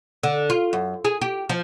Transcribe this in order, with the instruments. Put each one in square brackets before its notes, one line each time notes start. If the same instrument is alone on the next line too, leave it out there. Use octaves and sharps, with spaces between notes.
[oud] D3
F4
F#2
G#4
G4
F3